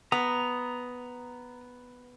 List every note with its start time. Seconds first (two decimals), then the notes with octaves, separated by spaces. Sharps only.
0.12 B3 A#5 D#6